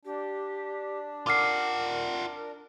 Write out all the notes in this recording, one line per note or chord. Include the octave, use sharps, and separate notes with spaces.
D4 G4
F4 A#4 F#5 D6 F6 C7